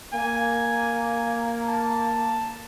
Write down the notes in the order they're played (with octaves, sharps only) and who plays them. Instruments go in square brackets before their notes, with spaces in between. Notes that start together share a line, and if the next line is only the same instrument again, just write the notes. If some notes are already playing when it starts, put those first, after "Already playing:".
[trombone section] A#3 [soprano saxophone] G#5
[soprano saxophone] A5